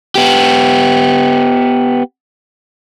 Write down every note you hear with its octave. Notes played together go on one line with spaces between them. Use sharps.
B3 G4